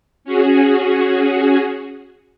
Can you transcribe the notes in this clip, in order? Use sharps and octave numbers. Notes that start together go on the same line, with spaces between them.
C#4 F#4 G#4